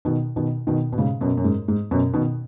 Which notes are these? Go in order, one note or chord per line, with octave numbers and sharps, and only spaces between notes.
B2 D#3
B2 D#3
B2 D#3
B2
G#2 C#3
F#2 B2
F#2
G#2
G#2
F#2 B2
B2 D#3